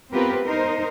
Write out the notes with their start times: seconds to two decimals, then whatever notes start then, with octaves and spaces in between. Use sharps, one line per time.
0.12 B3 C4 F4 G4 A#4 B4
0.44 D#4 A#4 C5